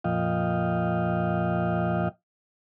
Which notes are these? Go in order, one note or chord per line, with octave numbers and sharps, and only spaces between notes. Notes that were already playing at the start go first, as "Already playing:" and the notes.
F2 A#2 F3 D#5 F5 G5